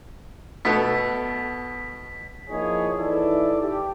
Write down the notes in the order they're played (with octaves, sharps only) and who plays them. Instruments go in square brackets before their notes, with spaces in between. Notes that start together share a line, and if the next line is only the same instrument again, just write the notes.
[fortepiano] B2 A3 B3 [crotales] B6
[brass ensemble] F3 A#3 D#4 E4 G#4 C#5
E3 D#4 E4 A4 D5 E5
G4